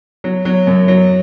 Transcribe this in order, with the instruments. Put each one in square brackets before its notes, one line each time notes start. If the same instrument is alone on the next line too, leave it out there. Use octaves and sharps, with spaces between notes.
[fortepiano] F#3
F#3
F#2
F#3